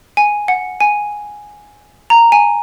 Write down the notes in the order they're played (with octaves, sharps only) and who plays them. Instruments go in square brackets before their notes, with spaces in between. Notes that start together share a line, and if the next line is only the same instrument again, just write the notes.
[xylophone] G#5
F#5
G#5
A#5
G#5